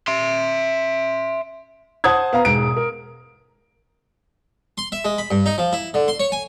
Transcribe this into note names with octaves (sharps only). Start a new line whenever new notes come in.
E5 C6
C5 F#5 A5 D#6 G#6
B3 F5 A#5
E1 G#2 D7
A#4
C6
E5
G#3
B5
G2
D#4
F3
E4
D3
C6
C#5
G#5